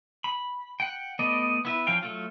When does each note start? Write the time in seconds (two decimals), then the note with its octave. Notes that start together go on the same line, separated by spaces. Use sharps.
0.24 B5
0.80 F#5 G5
1.19 A3 B3 D5 D#5
1.65 B3 E4 B4
1.87 F3 C#4 F5 G5
2.03 F#3 A3 F4